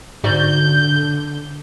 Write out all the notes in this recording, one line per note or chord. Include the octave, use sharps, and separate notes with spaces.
G#2 D3 F#4 D5 G6